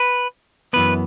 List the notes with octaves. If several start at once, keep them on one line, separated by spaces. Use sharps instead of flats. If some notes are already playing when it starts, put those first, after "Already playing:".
Already playing: B4
F#2 E3 B3 B4